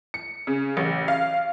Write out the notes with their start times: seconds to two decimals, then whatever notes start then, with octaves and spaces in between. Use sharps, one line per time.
0.14 C#7
0.47 C#3
0.77 A1
1.08 F5